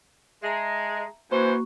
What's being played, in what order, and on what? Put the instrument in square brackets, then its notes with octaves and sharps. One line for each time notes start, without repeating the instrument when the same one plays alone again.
[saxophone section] G#3 [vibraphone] E5 A5 A#5
[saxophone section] F#2 E3 C5 [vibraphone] A#3 F#4 C#6